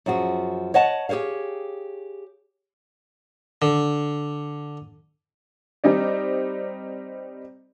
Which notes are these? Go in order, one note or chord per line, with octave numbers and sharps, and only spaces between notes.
F#2 F3 F#4 G#4
C#5 D#5 F#5 A5
G4 G#4 C5 C#5 F5
D3
G3 C4 D#4 D5